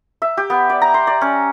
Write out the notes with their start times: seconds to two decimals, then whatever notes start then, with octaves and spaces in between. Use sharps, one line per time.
0.22 E5
0.37 G4
0.50 B3
0.70 D5
0.81 A#5
0.94 C6
1.07 D5
1.21 C#4